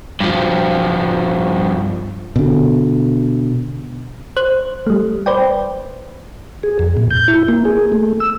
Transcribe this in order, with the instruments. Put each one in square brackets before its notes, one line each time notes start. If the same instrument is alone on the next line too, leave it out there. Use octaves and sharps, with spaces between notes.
[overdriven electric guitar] G2 F3
[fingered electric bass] B2 D3
[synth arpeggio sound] C5 F#6
G3 A3
B4 C5 D5 G5
[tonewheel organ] G#4
F2
A#2
G6
E4
A#3
G#4
A3
E6